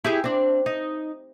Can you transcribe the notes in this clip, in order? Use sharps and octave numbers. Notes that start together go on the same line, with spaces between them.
E4 G4 G#4
C4 D4
D#4